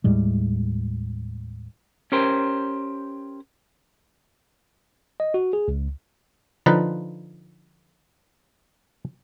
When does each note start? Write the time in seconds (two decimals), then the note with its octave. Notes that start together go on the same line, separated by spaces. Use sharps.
0.04 D#2 A2 G3 G#3
2.12 C#4 G4 A#4 C5
5.20 D#5
5.34 F#4
5.53 G#4
5.68 C#2
6.66 D3 F3 D#4 F4 B4